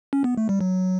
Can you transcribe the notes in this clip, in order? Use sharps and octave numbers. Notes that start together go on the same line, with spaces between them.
C#4
B3
A3
G3
F#3